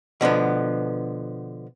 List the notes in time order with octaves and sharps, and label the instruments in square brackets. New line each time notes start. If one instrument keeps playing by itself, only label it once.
[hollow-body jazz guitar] B2 D3 F3 B3